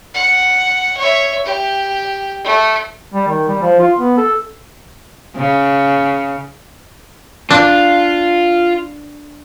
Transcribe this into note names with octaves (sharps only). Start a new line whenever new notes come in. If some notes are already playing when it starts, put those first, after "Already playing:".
F#5
C#5 E5
G4
A3
G3
D#3
G3
F3
F4
B3
A4
C#3
D4 F4